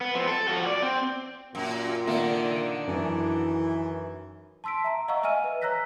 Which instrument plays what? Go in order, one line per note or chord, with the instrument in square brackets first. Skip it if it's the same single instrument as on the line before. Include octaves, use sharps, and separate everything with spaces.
[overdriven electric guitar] B3
F3 C4
A4
F3 F#4
D5
C4
[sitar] F#2 [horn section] A#2
[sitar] D#3 [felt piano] A#3 E5 [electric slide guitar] D4 F#5
[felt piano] F#2 [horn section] E3
[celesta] A5 C6 E6 B6 D7
E5 A#5
D#5 F5 F#5 A#5 C#6 E6
D#5 E5 G#5 F6 D#7
B4
C#5 A#5 E6 F#6 A#6 B6